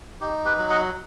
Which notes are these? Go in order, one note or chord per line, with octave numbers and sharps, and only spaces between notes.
D#4 G4
G4 B4
F#3
D#5 F#5